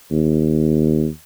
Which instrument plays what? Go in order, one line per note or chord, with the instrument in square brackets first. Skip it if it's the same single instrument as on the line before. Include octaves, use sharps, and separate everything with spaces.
[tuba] D#2